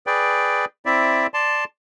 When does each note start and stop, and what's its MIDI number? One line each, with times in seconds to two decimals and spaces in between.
0.07 0.65 68
0.07 0.65 71
0.07 0.65 74
0.07 0.65 79
0.86 1.27 60
0.86 1.27 64
0.86 1.27 74
0.86 1.27 76
1.34 1.64 74
1.34 1.64 81
1.34 1.64 84